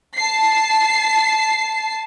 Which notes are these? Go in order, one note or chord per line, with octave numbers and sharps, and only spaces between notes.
A5 C7